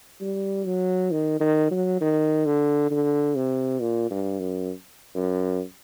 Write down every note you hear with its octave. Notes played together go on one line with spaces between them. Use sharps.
G3
F#3
D#3
D#3
F#3
D#3
D3
D3
C3
A#2
G2
F#2
F#2